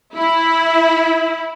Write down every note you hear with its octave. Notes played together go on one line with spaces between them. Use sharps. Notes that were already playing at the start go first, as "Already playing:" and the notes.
E4